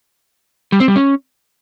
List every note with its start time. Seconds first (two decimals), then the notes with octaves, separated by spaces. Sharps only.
0.72 G3
0.80 C4
0.88 G3
0.96 C#4